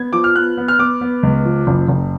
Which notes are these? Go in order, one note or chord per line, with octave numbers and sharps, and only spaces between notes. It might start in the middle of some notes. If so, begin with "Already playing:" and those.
Already playing: B3 G#6
F3 D6
F6
B3 F#6
B3
F6
B3 D6
B3
C#2
F3
F#1
F#1